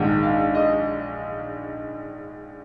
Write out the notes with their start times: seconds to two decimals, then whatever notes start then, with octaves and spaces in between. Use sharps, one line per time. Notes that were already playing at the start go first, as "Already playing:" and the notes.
Already playing: A#1 G#2 D#3
0.23 F5
0.55 D#5